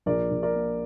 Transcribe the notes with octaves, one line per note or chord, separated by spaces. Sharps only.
A#1 A#4 D5
A#1
A#4 D5
A#3